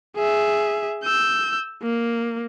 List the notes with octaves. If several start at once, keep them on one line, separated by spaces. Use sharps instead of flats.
G#4 E5
E6 G6
A#3